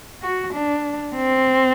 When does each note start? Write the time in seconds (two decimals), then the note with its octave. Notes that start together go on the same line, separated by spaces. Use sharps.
0.23 F#4
0.53 D4
1.15 C4